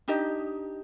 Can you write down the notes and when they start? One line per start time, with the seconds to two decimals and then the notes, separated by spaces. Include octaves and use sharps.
0.08 D4 D#4 G4 D#5